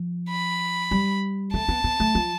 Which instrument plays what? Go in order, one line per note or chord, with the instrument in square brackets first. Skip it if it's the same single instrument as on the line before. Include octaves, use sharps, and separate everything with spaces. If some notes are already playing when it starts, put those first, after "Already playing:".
Already playing: [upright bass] F3
[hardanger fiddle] B5
[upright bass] G3
[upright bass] A3 [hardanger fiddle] A5
[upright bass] B3
B3
A3
F3